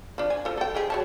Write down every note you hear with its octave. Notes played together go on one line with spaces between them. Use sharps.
F3 D4
G#5
F3 A4
A4 G5
G#3 G4 G#4
F#3 C#5 A5